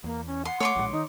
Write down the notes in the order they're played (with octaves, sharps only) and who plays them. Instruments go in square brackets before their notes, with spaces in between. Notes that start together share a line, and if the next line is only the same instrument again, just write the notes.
[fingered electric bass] E2 [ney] A#3
[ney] C#4
[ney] F#5 [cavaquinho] C6
[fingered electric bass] A3 [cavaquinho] C#5 C6 D6
[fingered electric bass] A#1 A2 G#3
[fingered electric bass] D#3 [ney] D#4